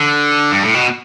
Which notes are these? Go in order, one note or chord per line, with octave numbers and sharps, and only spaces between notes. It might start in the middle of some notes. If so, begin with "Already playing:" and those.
Already playing: D3
G2
A2
B2